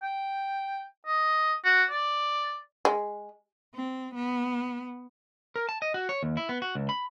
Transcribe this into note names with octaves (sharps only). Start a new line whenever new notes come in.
G5
D#5
F#4
D5
G#3
C4
B3
A#4
A5
D#5
F#4
C#5
D#2
E4
B3
F#4
C#2
B5